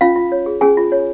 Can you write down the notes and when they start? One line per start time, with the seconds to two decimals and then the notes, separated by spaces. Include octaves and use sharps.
0.01 C#4 F4 F5
0.16 F4
0.32 C#5
0.46 G#4
0.61 C#4 G#4 G#5
0.77 F4
0.92 C#5